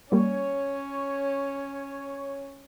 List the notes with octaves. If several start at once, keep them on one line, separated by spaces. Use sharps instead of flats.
G3 A#3 C#4 C#5